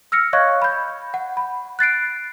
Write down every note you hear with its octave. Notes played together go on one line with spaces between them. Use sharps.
E6 F6 A#6 C#7
C#5 D#5 F5 C#6 F#6 G#6
B5 G6
F#5
B5
F#6 A6 C7 D7